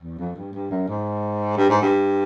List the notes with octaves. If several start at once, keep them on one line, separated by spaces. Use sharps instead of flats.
E2
F2
G2
G2
F#2
G#2
G2
G#2
G2